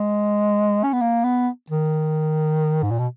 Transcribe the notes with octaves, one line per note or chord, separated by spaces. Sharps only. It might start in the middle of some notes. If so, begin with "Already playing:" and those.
Already playing: G#3
C#4
B3
A#3
B3
D#3
G#2
A#2
B2